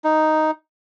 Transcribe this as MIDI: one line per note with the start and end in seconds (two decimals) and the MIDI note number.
0.04 0.51 63